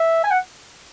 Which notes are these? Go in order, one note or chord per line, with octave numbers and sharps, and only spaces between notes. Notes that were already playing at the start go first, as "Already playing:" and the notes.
Already playing: E5
G#5
F#5